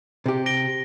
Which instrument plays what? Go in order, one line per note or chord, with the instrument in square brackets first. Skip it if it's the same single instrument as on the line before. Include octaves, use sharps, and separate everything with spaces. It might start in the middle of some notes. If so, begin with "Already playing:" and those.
[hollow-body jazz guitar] C3 G4
[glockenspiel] A#6 D7 G7